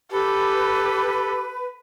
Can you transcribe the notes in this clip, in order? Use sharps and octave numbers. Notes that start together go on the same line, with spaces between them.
G4 A4 B4